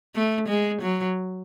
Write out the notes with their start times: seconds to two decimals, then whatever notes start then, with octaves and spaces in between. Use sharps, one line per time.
0.16 A3
0.48 G#3
0.81 F#3